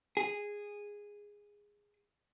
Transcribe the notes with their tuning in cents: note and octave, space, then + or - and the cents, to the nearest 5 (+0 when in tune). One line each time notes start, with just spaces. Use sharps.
G#4 -10